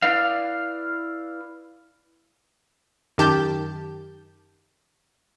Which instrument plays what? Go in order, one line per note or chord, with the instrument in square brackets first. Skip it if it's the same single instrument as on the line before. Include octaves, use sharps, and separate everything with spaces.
[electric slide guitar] E4 B4 D5 F5
[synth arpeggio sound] F#2 D#3 G4 A5 G6